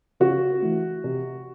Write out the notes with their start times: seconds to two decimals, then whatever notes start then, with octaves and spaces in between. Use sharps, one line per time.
0.20 C#3 F#4
0.62 E3 A3
1.04 C3